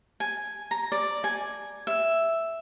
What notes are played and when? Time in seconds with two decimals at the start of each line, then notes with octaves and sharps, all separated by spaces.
0.20 G#5
0.71 A#5
0.92 D5
1.24 G#5
1.87 E5